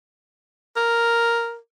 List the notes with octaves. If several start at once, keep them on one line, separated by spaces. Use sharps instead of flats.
A#4